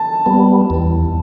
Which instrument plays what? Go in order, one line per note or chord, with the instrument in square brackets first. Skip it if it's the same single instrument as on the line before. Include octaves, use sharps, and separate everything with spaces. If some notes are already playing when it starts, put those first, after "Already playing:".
Already playing: [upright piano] A5
[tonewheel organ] G3 B3
E2